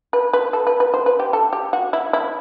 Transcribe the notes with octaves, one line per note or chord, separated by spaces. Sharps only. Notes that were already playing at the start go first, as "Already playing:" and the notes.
B4
B4
A4
B4
B4
C5
B4
G4
A4
G4
F#4
E4
E4